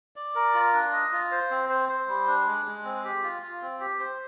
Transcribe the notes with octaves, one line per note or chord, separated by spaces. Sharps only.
D5
A#4
F4
D4
D#5
F4
C5
C4
C5
C5
G3
D4
G#3
G#3
C4
G4
F4
F4
C4
G4
C5